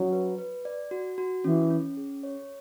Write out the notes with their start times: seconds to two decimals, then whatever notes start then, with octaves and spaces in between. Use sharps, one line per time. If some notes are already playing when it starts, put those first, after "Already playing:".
Already playing: F#3 C#4
0.12 B4
0.39 B4
0.65 D5
0.91 F#4
1.18 F#4
1.44 E3 C#4
1.70 C#4
1.97 G#4
2.23 C#5